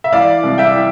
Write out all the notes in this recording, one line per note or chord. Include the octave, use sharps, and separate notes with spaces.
E5
E3 D5 F5
C2
E5 G5
E3